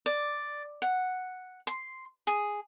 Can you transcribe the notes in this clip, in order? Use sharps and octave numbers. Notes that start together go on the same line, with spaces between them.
D5
F#5
C6
G#4